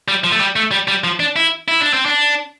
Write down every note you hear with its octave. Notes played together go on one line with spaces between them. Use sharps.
G3
F3
A3
G3
A3
G3
G3
F3
D4
E4
E4
D4
C4
D4